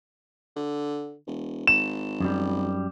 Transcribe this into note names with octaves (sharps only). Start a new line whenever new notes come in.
D3
E1
G#1 E7
F#2 G3